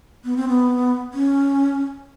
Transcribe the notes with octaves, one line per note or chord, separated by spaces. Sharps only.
B3
C4
B3
C#4